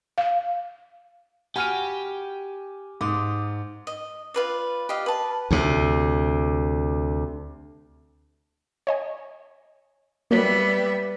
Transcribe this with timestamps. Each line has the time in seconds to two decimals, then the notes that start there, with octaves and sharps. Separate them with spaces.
0.18 F5
1.56 F#4 G4 G#5 B5 F6 D#7
3.01 G#2 C6 D6 D#6
3.87 D#5
4.34 F4 B4 D5
4.89 G4 D#5 F5
5.06 B4 A5
5.51 D2 C3
8.87 C#5 D#5 G#5
10.31 F#3 G3 A#3 B3 E5